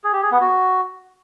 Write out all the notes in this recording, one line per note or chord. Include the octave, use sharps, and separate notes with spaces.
G#4
G4
G#4
B3
F#4